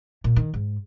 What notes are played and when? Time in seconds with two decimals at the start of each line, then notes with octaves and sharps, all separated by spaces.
0.24 A#2
0.36 D#3
0.54 G#2